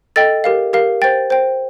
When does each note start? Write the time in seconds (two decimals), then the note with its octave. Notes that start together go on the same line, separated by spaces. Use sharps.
0.16 A4 D#5 G5 A6
0.44 G4 A#4 F5
0.73 G4 A#4 F5
1.02 C5 G5 A6
1.30 C5 G5